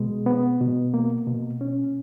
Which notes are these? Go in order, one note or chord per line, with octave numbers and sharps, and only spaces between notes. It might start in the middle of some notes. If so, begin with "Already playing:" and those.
Already playing: B2 G#3
B3
B2
A#3
B2
C#4